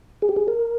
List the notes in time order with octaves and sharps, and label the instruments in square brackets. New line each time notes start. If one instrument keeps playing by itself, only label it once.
[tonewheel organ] G#4
G4
G#4
A#4